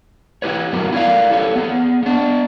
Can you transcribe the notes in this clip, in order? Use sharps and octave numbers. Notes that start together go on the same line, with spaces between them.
E4 G4 B4 C#5
G2 F#3 B3 F#4 G4 A#4
E4 A#4 C5 D5 F5
G4 A4 C#5
B3 G#4
B3 D4